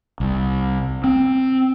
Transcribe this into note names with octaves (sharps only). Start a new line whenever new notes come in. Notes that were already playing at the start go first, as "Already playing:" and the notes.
C2
C4